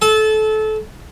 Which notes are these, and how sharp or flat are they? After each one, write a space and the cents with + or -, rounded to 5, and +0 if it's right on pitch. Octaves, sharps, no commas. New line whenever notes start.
A4 -25